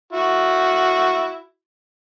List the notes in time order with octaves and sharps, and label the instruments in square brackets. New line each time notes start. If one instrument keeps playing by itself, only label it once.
[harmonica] E4 F#4